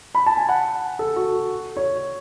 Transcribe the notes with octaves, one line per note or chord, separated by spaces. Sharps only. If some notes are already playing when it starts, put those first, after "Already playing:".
B5
A5
G#5
F#5
A4
F#4
C#5